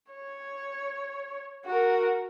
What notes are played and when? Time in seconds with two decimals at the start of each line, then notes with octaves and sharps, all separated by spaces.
0.12 C#5
1.66 F#4 A#4